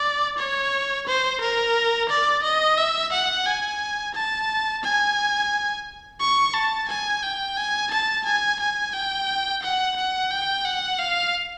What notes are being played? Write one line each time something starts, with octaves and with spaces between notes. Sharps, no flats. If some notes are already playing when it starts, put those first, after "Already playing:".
Already playing: D5
C#5
C5
A#4
D5
D#5
E5
F#5
G#5
A5
G#5
C#6
A5
G#5
G5
G#5
A5
G#5
G#5
G5
F#5
F#5
G5
F#5
F5